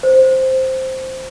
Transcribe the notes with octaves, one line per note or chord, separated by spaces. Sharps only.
C5